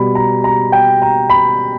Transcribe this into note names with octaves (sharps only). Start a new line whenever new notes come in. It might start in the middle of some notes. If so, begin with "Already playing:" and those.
Already playing: B2 G3 B5
A#5
A#5
G5
A#5
B5